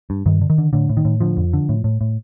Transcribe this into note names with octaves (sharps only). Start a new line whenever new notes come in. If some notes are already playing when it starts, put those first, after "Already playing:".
G2
G2 D#3
D3
D#3
D3
A2 D3
A2
D#3
A2
D3 F3
F2
D3
A2
A2
A2